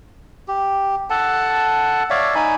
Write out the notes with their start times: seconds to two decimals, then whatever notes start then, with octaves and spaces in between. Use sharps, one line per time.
0.48 G4
1.10 A4 F#5 A5
2.10 C#5 D5 E5 F5
2.35 D#4 G#5 B5